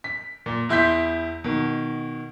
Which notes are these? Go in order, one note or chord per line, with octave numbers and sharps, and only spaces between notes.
B6
A#2
E2 E4 C6 G6 B6
B2 D#3